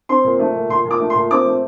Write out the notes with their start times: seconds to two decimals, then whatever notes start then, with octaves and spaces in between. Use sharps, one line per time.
0.09 C4 C6
0.25 A#2
0.40 A3
0.56 A#2
0.70 A#2 C6
0.85 A#2
0.91 D6
1.00 A3
1.10 C6
1.16 A#2
1.31 C4 D6
1.46 A3